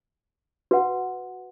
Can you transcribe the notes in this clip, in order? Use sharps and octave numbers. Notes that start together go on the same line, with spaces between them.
F#4 B4 F#5